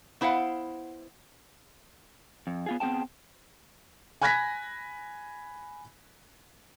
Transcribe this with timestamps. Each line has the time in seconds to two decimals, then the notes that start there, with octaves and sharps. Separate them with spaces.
0.21 B3 E4 C5 F5 F#5
2.47 F2
2.66 B3 F4 G#4
2.80 B3 C4 G#4 G5 A5
4.22 G#5 B5 F#6 G#6 A#6 B6